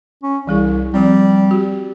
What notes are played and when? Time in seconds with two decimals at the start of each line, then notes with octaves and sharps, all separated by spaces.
0.23 C#4
0.47 C2 E3 G3 G#4
0.94 F3 G3 C4
1.51 F#4 G4